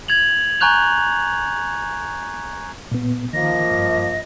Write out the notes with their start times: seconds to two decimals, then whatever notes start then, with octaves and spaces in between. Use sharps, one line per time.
0.08 G#6 A6 F7 F#7
0.60 G#5 A#5 C#6 F#6 G6 F7
2.92 A#2 B3
3.33 D#3 F3 A#3 D#5 A#6
3.71 G2